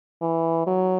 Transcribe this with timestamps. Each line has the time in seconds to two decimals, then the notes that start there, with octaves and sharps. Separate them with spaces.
0.22 E3
0.67 F#3